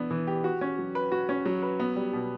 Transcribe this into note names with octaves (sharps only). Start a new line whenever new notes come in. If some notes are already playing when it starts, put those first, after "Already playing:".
Already playing: E3 B3 D4
E3
G4
F#4
C#4
F#3
B4
F#4
C#4
F#3
B4
B3
G3
B2